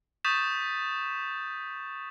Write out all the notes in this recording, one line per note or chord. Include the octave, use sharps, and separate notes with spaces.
C#6 D#6 G6 A6 B6 E7